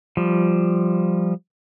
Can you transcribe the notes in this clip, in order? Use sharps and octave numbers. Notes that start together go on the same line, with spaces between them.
F3 G3